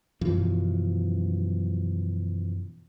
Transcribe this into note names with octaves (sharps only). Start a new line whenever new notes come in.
F#2 B2 E3 F3